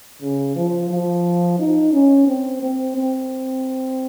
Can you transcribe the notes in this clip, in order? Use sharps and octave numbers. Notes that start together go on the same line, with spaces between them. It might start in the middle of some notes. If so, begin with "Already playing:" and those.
C#3
F3
F3
D#4
C#4
C4
C4
C4